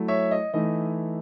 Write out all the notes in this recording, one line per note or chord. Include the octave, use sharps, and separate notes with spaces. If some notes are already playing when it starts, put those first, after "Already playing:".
Already playing: F#3 A3 E4
C#5 E5
D#5
E3 A3 D#4 D#5